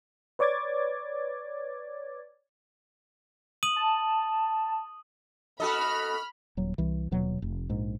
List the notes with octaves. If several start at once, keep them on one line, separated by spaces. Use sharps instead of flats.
B4 C#5 D5 D6 G#6 A6
D#6 D#7 F#7
A5
F#4 A4 D#5 B5 F6
D#1 F#3
C2 E3
D#1 B2 F#3
F1
A#1 G#2